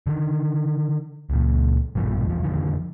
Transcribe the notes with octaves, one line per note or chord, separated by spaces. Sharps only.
D3 D#3
C#2 A#2
A#1 G2 B2 F3
E1 F3
F2 D3 D#3 F3